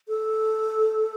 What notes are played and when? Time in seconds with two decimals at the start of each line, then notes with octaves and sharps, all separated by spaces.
0.08 A4